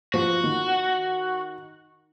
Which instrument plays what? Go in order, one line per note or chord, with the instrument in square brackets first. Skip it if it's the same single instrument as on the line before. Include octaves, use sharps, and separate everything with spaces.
[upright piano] F3 [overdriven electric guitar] F#4
[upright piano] D#3